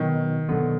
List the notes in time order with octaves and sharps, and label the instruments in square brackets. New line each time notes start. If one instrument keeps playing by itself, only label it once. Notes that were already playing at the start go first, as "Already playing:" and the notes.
Already playing: [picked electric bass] B2 F#3 B3 [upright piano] D#3
[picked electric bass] B2 F#3 B3 [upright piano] D3